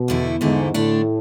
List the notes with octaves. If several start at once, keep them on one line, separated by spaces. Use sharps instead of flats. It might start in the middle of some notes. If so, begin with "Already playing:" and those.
Already playing: B2
E2 D3 A3 E4
E2 G#2 D3 A3 E4
A2 D3 A3 D4